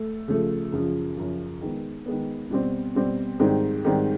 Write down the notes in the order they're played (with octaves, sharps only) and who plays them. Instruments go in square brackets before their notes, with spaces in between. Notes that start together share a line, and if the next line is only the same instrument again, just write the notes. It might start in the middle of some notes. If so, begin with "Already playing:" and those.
Already playing: [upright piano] A3
C#3 F3 A3
F#2 C#3 F3
F#2 C#3 F3
D#3 G#3 B3
D#3 G#3 B3
B2 G3 C4
B2 G3 C4
G#2 D#3 G3 C4
G#2 D#3 G3 C4